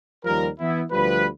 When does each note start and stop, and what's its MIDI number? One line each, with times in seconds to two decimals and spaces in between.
0.24 0.48 39
0.24 0.48 53
0.24 0.48 55
0.24 0.48 70
0.60 0.83 52
0.60 0.83 59
0.60 0.83 64
0.92 1.27 38
0.92 1.27 53
0.92 1.27 55
0.92 1.27 71